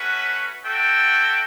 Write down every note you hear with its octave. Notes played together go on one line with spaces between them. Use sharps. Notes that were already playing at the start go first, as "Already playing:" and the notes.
Already playing: A3 C#4 F#4 B4
F#4 A4 E5 G5